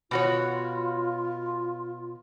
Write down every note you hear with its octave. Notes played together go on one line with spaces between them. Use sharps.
B2 F4 F#4 C#5